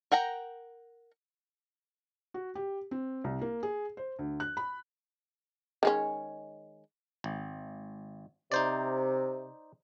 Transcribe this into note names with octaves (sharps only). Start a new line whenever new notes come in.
A#4 F#5 G5 A#5
F#4
G4
C4
C2
A#3
G#4
C5
D2
F#6
B5
D#3 G#3 C#4
G#1
C3 D#4 C5 D5